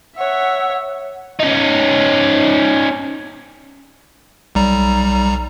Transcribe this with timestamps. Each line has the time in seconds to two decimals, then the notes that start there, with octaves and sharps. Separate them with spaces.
0.18 C#5 E5 F#5
1.40 C#4 D#4
4.55 B1 G3 A#5